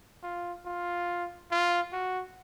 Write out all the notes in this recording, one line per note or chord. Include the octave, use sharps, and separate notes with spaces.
F4
F4
F4
F#4